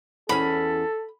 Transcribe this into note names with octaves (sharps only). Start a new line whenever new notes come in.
E2 C#4 A4 B5